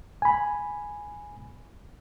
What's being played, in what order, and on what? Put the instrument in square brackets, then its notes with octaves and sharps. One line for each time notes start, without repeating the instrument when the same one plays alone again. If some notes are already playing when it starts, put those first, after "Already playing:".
[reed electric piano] G#5 B5